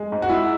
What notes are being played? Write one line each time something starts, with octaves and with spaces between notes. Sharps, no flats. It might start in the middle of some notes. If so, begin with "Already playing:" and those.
Already playing: G#3
G#2
F#4
G#3 E4